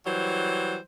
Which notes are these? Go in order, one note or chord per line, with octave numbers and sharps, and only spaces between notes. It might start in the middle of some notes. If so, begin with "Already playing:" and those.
E3 F#3 G3 C5